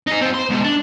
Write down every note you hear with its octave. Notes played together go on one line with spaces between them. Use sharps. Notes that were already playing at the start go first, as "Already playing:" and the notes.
D#4 G#4
C4 F4
C5 C6
G#2 B2
D4